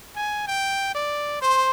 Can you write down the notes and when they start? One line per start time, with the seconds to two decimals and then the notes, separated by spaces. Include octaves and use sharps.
0.16 G#5
0.47 G5
0.95 D5
1.42 C5 C6